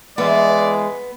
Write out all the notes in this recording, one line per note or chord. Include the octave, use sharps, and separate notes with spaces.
E2 G#3 B3 D5 E5